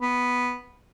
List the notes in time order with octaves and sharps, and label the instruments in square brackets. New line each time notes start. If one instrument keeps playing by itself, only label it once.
[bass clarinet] B3